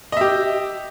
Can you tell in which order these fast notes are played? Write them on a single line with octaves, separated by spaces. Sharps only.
D#5 E5 G4